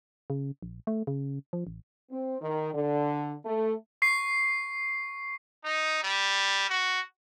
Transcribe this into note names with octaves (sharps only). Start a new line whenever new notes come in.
C#3
A#1
A3
C#3
F3
A1
C4
D#3
D3
A3
C#6 C7
D#4
G3
F#4